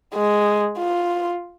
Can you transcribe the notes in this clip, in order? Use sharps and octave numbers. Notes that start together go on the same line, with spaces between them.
G#3
F4